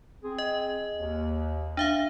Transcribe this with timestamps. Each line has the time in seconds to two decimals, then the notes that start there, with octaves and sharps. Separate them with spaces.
0.22 C4 G#4
0.38 D#5
0.96 D#2
1.77 D4 E5 F5